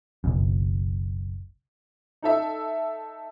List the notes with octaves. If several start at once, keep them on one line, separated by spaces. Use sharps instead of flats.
F#1 B1 F#2
D#4 A4 E5